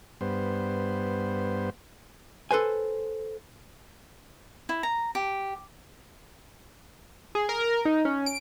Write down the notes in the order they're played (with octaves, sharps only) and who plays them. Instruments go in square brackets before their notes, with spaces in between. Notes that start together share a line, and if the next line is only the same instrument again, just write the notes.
[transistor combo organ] G2 B3 C5
[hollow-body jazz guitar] A4 B4 C5 G#5
[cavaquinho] E4
A#5
G4
[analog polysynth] G#4
A#4
D#4
C#4
D7